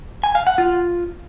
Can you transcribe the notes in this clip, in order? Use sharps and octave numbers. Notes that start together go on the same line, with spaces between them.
G#5
F5
F#5
F4